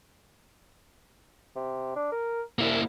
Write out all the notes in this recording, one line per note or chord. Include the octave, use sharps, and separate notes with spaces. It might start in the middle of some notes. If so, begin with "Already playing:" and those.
C3
D4
A#4
C2 A#3 E4